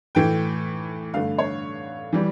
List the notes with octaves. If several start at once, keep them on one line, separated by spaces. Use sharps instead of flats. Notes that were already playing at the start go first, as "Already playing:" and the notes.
A2 E3 A3 G5
G2 D3 A3 F5
C#5
E3 G3